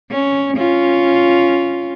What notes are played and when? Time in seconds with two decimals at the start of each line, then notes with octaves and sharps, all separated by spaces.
0.11 C#4
0.57 C#4 F4